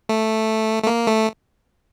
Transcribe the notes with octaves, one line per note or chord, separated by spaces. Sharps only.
A3
A3
A#3
A3